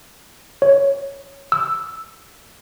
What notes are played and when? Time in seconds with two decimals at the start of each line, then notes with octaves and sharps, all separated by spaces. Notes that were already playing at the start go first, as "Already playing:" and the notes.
0.62 C#5
1.52 E6